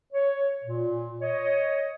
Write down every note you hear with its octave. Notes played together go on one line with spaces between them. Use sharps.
C#5
A#2
C#5 D#5